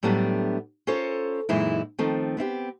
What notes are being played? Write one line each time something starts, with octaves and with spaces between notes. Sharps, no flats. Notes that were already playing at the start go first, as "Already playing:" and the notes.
A2 F#3 G3 A3 B3 D4
C#4 F4 A4 A#4 C5 C#5
F#2 A#2 E3 G#3 D#4 E4
D#3 F3 A3 C4
B3 C4 E4 G4